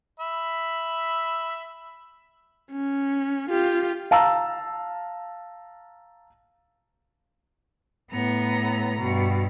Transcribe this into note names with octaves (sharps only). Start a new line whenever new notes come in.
E5 B5
C#4
F4 G4
F5 A5 A#5 E6
A2 B3 A#5
G2 B2